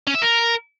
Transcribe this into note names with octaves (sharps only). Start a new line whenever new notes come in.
C#4
E5
A#4